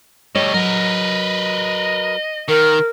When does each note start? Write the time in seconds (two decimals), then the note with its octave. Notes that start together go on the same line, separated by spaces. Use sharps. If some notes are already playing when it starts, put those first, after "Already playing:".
0.35 G3 A3 C#5 D#5
0.54 F#3 A#4 B4
2.48 D#3 A#4